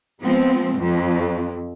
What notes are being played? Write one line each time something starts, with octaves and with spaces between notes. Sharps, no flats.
F3 G#3 B3 C4
F2